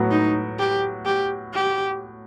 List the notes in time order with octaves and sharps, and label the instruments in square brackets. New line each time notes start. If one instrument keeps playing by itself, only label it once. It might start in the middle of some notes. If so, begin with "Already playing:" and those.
Already playing: [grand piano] A2 F#3 B3 F#4
[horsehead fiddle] D#4
G4
G4
G4